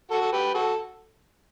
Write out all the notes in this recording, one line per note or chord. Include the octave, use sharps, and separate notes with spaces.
F#4 A4
A4
G4 B4
F#4 A4